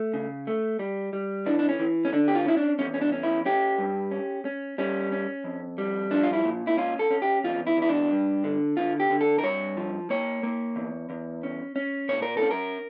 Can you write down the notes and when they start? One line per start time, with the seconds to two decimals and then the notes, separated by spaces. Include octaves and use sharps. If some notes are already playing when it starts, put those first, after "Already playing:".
Already playing: A3
0.14 C#3
0.47 A3
0.79 G3
1.13 G3
1.46 E3 D4
1.59 D4
1.69 C#4
1.79 E3
2.05 C#4
2.13 D3 D4
2.28 G4
2.35 F4
2.46 C#4 E4
2.57 D4
2.79 E2 C#4
2.94 C#4
3.01 D4
3.12 C#4
3.23 E4
3.46 C#4 G4
3.78 G2
4.11 C#4
4.45 C#4
4.78 G3 C#4
5.12 C#4
5.44 F2
5.78 G3
6.11 F3 D4
6.23 F4
6.33 E4
6.45 A#2
6.67 E4
6.77 C#4 F4
6.99 A4
7.11 C#4
7.22 G4
7.44 E2 F4
7.67 E4
7.77 E2 E4
7.89 D4
8.11 G2
8.44 D3
8.77 D3 F4
9.00 G4
9.10 D3
9.21 A4
9.39 A#4
9.43 G2 C#5
9.77 F3
10.10 A#3 C#5
10.43 A#3
10.76 E2
11.10 E2
11.43 C#4
11.76 C#4
12.09 A#2 C#5
12.22 A#4
12.37 A4
12.42 C#4
12.51 A#4